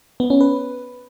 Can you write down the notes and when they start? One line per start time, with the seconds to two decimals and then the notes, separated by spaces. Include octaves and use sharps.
0.20 B3
0.30 C#4
0.41 B4